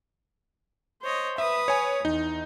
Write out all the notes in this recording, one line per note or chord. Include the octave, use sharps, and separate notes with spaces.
C5 C#5 D#5
B4 E5 B5 D#6
C#5 G#5
E2 D#4